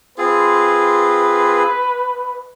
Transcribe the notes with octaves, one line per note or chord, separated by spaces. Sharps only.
C4 F4 G#4 B4